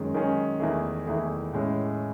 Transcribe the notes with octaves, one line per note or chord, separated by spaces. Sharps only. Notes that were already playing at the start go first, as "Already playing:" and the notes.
Already playing: F#2 D#3 G#3 C#4 G#4
F#2 D#3 G#3 C#4 G#4
E2 D#3 A3 E4 G#4
E2 D#3 A3 E4 G#4
A2 G#3 C#4